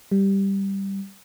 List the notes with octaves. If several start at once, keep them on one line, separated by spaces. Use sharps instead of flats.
G3